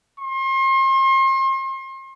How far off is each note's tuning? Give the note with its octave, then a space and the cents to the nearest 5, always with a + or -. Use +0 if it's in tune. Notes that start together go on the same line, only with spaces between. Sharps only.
C6 +40